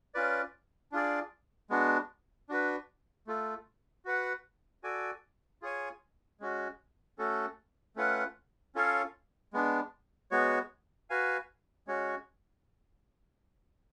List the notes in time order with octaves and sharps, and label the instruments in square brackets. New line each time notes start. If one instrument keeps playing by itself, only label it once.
[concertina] C#4 F4 B4 D5
D4 F4 G#4 D5
G#3 B3 D4 F#4
D4 F#4 B4
A3 F4 A4
F#4 B4 F#5
F#4 A4 D5 G#5
F4 G#4 C#5 G#5
G#3 C#4 F#4
A3 C#4 F#4 A4
A3 C#4 F4 B4 F#5
C#4 F4 A4 C#5 F5
G#3 B3 D4
G#3 B3 F#4 C#5
F#4 B4 F5 G#5
G#3 C#4 F#4 C#5